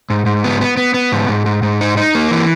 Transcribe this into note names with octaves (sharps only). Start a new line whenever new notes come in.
G#2
G#2
B3
B3
B3
B3
G#2
G#2
G#2
G#2
D#4
D#4
A#3
E3